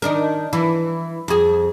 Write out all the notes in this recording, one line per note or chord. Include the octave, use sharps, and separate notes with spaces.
D#3 D4 A#4
E3
F2 G#4